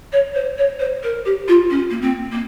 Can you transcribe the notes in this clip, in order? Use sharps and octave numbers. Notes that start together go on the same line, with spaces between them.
C#5
C5
C#5
C5
A#4
G4
F4
C#4
A#3
C4
A#3